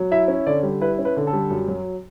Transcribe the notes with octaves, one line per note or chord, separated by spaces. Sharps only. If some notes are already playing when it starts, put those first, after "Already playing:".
Already playing: F#3
E4 E5
C#4
D3 D5
G3
E4 B4
C#4
B4
D3
A4
G3
F#2
F#3